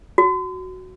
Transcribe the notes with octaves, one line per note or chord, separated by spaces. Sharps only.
F#4